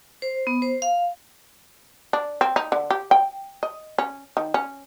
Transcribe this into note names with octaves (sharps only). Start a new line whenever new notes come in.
C5
B3
C5
F5
D4
C4
D#4
D3
G4
G5
D#5
C#4
D#3
C#4